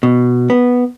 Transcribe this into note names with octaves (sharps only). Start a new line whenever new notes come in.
B2
B3